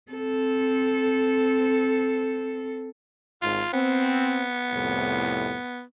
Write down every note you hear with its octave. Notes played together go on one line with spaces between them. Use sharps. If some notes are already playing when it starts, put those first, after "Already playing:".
C4 A4
G#1 F4
B3 C4
C2 F2 A2